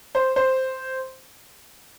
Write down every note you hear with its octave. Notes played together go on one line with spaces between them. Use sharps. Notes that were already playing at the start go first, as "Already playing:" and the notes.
C5
C5